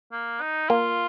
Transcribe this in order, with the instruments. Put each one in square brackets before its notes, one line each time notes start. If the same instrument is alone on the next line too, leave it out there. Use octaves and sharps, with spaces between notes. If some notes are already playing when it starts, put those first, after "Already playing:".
[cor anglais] A#3
D#4
[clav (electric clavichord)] A#3 [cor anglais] F4